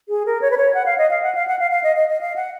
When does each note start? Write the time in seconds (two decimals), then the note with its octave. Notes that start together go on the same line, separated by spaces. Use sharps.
0.09 G#4
0.26 A#4
0.42 C#5
0.51 B4
0.58 C#5
0.74 F#5
0.86 F5
0.98 D#5
1.11 F5
1.22 F#5
1.35 F5
1.48 F#5
1.59 F5
1.71 F5
1.84 D#5
1.96 D#5
2.09 D#5
2.21 F5
2.36 F#5